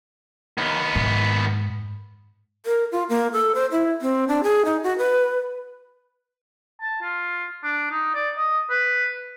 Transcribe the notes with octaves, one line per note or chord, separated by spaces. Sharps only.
D#2 B3
G#2
A#4
F4
A#3
A4
C5
E4
C4
D4
G#4
D#4
F#4
B4
A5
F4
D4
D#4
D5
D#5
B4